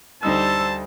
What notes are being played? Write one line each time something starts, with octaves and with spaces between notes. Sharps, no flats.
D2 G3 D#4 A4 C5 A5 E6